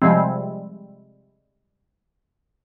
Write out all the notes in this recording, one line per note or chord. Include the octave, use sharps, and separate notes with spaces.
C3 F3 G3 G#3 C4